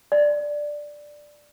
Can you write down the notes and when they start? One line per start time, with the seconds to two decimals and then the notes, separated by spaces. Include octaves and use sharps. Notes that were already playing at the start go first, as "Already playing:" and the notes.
0.12 D5